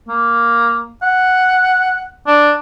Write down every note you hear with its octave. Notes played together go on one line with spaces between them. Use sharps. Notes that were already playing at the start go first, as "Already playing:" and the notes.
A#3
F#5
D4